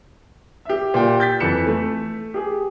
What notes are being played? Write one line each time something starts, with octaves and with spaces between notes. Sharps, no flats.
G4 E5
A#2 G4 G5
G6 A6 B6
F2 E3 B4 C#7 E7
A3
G4 G#4